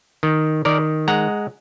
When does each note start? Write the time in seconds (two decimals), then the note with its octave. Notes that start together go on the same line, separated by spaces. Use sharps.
0.23 D#3
0.65 D#3 A#4 D5
1.08 G#3 F#5 A#5